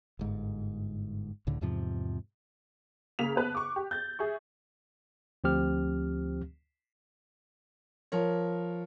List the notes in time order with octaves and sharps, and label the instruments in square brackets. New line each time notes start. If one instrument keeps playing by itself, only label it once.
[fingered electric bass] G1 G#2
C#2 A2 D3
E2 G#2 C3 F3
[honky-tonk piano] C#3 A#3 B6 F7
B3 B4 A5
C#6 D6 F#6
G4
G6 A6
G#4 E5 C#6
[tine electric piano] D2 F3 C4 G4 F6
[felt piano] F3 A#4 C#5